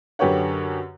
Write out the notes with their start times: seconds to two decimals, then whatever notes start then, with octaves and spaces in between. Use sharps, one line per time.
0.19 F#2 D3 G4 B4 C#5 F#5